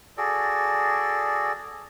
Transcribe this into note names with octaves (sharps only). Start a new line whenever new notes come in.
F#4 G#4 A4 D5